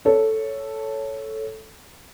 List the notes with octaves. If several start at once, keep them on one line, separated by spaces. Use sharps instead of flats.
A4 C#5